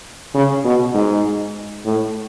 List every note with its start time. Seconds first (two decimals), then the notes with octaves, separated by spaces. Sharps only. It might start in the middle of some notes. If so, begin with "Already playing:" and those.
0.34 C#3
0.65 B2
0.94 G#2
1.85 A2